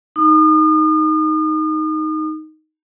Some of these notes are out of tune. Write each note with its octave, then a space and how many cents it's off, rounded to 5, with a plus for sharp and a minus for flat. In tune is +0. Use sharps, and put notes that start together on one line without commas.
D#4 +5 D#6 -40